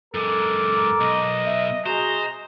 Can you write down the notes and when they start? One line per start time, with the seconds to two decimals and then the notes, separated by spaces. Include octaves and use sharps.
0.14 F#2 G#3 A4 A#4 A#5 D6
1.01 B1 D#5
1.46 E5
1.86 F#4 G#4 C5 D#5 A#5